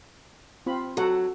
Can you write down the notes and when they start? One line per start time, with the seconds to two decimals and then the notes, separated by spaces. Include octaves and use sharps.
0.66 C4 F4 B5
0.97 F#3 F#4 A4 F#5